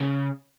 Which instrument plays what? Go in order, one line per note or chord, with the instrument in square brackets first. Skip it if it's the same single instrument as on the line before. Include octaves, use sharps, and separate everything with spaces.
[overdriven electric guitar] C#3